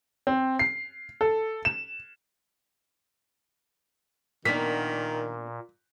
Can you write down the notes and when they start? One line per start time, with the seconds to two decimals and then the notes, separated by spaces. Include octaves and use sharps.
0.27 C4
0.59 C7
1.21 A4
1.65 E7
4.45 A#2 D#3 A#3 B3 D4 B6